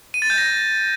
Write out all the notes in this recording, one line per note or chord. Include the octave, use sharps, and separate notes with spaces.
D#7
A6
G6
A#6